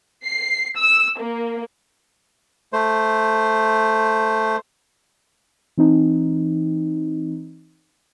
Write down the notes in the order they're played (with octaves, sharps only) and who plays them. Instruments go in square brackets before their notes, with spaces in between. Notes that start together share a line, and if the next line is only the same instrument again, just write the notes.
[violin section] C7
E6
A#3
[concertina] A3 C5
[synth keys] E3 C4 D#4